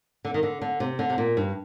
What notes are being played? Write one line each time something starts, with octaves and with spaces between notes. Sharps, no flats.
D3
D#3
D3
D3
C3
D3
C3
A#2
G2